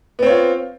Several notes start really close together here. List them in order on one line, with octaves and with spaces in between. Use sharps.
B3 C4 C#5 F4